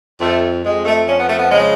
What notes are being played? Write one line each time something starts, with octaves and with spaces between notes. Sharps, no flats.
F2 A3
F2 G#3
A3
F3 C#4
B3
A3
B3
C#3 G#3